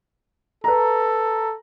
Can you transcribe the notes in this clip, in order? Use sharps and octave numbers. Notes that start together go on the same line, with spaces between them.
A4 B4 A#5